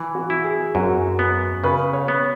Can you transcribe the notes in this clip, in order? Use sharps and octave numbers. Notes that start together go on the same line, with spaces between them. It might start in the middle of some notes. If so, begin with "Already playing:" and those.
Already playing: E3
F#4
E4
G#4
F#2 F#4
B3
C#3 B4
C#5
B3